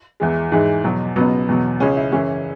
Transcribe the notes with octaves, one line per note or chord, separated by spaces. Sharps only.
E2 E3 G#3
G#2 E3 G#3
E2 B2 F#3
C#2 B2 F#3 B3
E2 B2 F#3
C#2 C#3 G#3 C#4
E4
F#2 C#3 E3 C#4